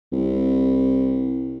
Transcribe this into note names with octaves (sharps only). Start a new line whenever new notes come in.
C2